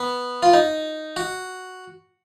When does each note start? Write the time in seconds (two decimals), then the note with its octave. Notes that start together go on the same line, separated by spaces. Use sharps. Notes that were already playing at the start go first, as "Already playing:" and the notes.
Already playing: B3
0.43 F4
0.53 D#4
1.16 F#4